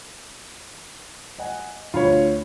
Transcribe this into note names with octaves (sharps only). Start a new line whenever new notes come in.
D#5 F#5 G#5
D2 F4 C#5 B5